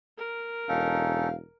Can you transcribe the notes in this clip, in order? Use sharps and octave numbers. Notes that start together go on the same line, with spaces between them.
A#4
E1 C#4 D#4 A4 F5